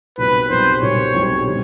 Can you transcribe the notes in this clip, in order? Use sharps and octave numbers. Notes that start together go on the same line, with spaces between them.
B1 A#2 G3 C4 B4
B1 A#2 G3 C4 C5
B1 A#2 G3 C4 C#5
B1 A#2 G3 C4
D3 G3